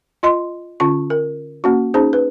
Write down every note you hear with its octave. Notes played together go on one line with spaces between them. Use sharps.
F4 D#5 C6
D3 C#4 F4 C#6
A#4
A#3 C#4 F#4
C#4 D#4 G#4 C5
B4